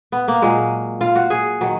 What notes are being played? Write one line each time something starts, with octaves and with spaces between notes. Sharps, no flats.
B3
A#3
A#2 F#3 G#3
F4
F#4
G#4
D#3 F#3